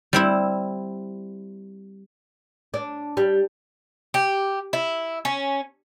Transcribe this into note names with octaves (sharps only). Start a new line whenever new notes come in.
G3 C4 E4
D4
G3
G4
E4
C#4